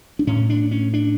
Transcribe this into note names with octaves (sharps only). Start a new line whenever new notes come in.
D4
A2 C#4
D4
C#4
D4